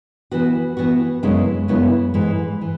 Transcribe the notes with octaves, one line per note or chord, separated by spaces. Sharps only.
E3 B3 F#4
E3 B3 F#4
F#2 C#3 G#3 B3 E4
F#2 C#3 G#3 B3 E4
G#2 E3 G#3
E3